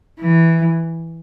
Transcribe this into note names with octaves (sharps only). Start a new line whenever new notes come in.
E3